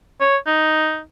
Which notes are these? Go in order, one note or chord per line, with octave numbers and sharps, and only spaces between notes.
C#5
D#4